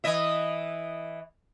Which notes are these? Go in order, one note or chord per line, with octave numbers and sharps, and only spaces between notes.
E3 D#5 E5